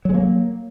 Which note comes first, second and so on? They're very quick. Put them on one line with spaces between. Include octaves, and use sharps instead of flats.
F#3 G#3 A#3